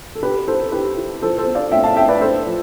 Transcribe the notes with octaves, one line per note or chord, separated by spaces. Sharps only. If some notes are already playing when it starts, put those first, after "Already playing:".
A4
B2 G4 B4
E4 A4 C5
E4 G4 B4
E4
F3 A4 C5
A4 C5
B3
D5 F5
A2 E5 G5
F5 A5
A2 E5 G5
B4 D5
D4 A4 C5
F3